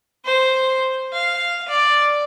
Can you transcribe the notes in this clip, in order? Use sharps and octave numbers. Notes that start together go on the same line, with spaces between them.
C5
F5
D5